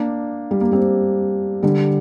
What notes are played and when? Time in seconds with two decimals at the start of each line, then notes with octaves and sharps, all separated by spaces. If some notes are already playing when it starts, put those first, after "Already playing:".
Already playing: A#3 D4
0.51 G3
0.61 A#3
0.72 G3 C4
1.63 D3 G3